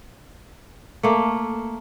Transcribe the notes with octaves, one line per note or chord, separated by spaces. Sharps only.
A3 A#3